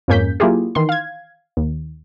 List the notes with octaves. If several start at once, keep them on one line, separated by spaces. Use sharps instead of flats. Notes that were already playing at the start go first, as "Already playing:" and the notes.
F2 G#2 A#3 C#4 G6 B6
F#3 A#3 E4 F4 G4 G#4
D#3 E3 C6
F5 G#6
D#2